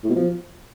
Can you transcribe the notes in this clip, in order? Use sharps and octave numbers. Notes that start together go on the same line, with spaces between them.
A2
B2
F3